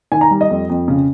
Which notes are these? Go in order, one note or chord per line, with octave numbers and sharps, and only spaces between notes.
D#3 G#5
A#5
G3
D#5
F2
F2
C#3